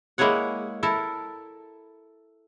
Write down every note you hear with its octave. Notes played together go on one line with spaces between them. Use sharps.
G#3 A#3 E4 G#4 C#5 F#5
E4 A4 A#4 A5